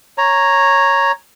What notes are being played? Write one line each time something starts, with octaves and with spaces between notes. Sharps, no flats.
C#5 A#5